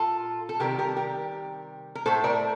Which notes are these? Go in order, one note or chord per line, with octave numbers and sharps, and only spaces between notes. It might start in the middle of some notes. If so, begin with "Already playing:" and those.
Already playing: A#2 F4 A4
A4
C3 D#3 G3 G4 A#4
G4 A#4
G4 A#4
A#4
A2 A3 A4 C5
A#4 D5